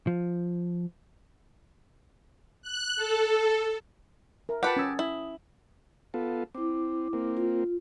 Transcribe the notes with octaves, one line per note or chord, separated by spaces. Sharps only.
F3
F#6
A4
A#4 E5
F4 G4 B4 F#5 A5 B5 B6
C#4 D#6 E6 G#6 A6
E4 D#6
B3 F4 A4
C4 E4 D6
A#3 C4
F4